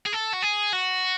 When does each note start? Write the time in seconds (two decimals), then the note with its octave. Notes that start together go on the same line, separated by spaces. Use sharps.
0.06 G#4
0.13 A4
0.34 F#4
0.43 G#4
0.73 F#4